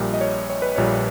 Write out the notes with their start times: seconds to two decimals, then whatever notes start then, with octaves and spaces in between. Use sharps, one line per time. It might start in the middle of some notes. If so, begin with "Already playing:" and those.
Already playing: A#1 A#2 G3
0.14 D#5
0.21 C#5
0.50 C#5
0.62 B4
0.76 A#1 A#2 G3 C#5